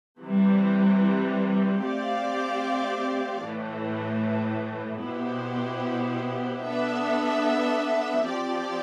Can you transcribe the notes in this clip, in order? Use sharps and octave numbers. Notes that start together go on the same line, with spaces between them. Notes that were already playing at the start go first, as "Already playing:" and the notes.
C3 E3 G3
A3 C4 G4 D5 F5
A2 E3 A3
B2 B3 E4 G4 C5
B3 D4 A4 E5
F3 C4 G4 D5